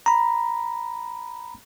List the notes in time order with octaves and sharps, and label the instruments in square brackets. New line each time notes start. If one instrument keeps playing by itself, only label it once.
[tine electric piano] A#5 B5